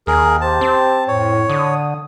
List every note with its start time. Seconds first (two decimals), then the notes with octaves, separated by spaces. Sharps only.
0.07 D#2 G#4 A#4
0.41 G4 C5 A5
0.61 C4
1.08 F2 A2 C#5
1.50 D3 D#6